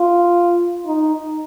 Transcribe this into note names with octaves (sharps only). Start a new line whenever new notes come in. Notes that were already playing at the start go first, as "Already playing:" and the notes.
Already playing: F4
D#4